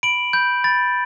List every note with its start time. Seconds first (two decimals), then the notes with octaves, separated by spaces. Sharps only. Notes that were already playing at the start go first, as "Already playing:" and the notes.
0.03 B5 D7 F#7
0.33 B5 G6
0.64 B5 A6